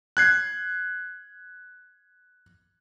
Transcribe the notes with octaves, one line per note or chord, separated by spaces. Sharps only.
F#6 G#6 C7